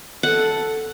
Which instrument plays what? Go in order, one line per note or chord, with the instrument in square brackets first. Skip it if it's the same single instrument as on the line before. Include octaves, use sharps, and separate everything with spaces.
[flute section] A4 [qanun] F#5